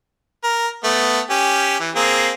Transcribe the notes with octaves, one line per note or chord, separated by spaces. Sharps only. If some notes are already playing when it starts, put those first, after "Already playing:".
A#4
A3 B3
C#4 G4
E3
A#3 C4 G#4